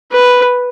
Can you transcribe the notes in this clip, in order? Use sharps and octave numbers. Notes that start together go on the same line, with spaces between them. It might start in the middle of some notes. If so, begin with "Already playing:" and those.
B4